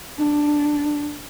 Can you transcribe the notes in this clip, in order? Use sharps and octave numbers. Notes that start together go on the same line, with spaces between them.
D4